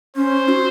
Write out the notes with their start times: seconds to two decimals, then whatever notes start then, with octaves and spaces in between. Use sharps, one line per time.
0.16 C#4 C5
0.48 F#4